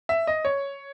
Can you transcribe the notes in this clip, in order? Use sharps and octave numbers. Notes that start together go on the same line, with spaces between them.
E5
D#5
C#5